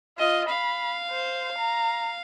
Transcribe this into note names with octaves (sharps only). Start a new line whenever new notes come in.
F4 D#5
F5 B5
C5
A#5